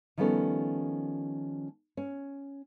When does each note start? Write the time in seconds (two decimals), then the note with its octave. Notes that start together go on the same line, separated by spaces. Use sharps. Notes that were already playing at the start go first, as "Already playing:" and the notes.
0.17 D#3 F3 G3 B3 C#4 A4
1.97 C#4